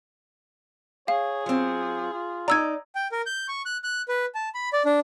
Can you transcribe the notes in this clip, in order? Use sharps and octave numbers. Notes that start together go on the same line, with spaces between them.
G#4 C#5 F5
F#3 C4 F4
F4
D#4 D5 A#5 E6 G#6
G5
A#4
G6
C#6
F#6
F#6
B4
A5
B5
D5
D4